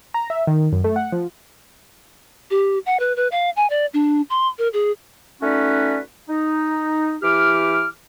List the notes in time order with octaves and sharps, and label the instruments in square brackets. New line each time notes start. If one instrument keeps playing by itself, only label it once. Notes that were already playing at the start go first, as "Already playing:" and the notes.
[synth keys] A#5
E5
D#3
F#2
A3
F#5
F3
[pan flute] G4
F#5
B4
B4
F5
G#5
D5
D4
C6
A#4
G#4
[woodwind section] A3 C#4 D#4 F#4 B4 D5
D#4
E3 G4 D6 F6